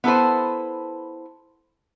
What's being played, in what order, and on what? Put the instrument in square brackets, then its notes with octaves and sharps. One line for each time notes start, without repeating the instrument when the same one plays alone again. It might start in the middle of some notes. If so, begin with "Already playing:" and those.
[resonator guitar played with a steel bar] B3 E4 A4 B4 C5